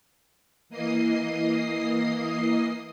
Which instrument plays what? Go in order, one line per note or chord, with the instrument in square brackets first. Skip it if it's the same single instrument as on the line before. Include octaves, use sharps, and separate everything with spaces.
[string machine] E3 A#3 D#5 D#6 C7